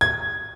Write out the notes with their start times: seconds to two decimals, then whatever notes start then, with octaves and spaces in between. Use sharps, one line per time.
0.01 G#6